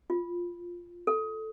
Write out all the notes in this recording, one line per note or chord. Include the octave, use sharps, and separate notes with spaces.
F4
A4